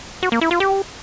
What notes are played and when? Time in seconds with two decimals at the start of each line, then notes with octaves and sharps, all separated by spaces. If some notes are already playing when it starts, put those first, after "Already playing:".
0.23 F#4
0.32 A#3
0.41 E4
0.51 F4
0.60 G4